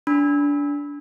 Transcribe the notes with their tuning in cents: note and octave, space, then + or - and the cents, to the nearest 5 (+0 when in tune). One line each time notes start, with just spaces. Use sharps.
D4 -25 B5 +0